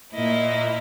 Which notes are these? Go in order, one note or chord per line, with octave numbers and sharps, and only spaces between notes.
A#2 A#3 E4 D#5